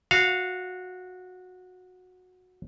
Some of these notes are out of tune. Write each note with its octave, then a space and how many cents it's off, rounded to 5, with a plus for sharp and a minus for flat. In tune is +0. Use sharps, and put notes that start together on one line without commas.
F#4 -15 F5 +0